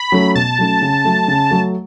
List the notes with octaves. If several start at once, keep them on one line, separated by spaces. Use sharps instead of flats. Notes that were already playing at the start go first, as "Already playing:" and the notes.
Already playing: B5
F#3 A3 C#4
B2 A5
F#3 A3 C#4
C#3
F#3 A3
C#3
F#3 A3